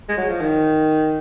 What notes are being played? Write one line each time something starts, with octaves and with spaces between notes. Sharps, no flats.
G#3
F#3
F3
D#3